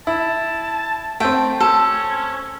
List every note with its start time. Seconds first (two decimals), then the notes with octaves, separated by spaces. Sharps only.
0.07 E4 A5
1.20 A3 C4 G5
1.60 C#4 A4